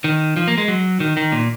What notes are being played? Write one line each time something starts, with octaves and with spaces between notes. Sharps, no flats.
D#3
F3
A#3
G#3
F#3
D#3
D#3
A#2